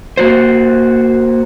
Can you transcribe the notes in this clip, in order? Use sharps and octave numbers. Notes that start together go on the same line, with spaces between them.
A#3 F#4 C5